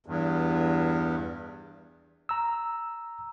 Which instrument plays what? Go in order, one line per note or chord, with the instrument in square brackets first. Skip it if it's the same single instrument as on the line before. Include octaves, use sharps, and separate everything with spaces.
[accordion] E2 G2
[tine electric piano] A#5 E6